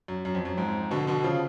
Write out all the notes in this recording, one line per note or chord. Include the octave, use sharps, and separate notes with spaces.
F#2
F#2
F2
F#2
F2 G#2
B2 D3
B2 D3
C#3 F3